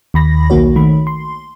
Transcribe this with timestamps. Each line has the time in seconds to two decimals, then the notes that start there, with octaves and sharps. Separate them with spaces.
0.14 D#2 B5 A#6
0.50 B1 D#3 A#3 F#4 C#5
0.76 D#3 A3 B5
1.07 C6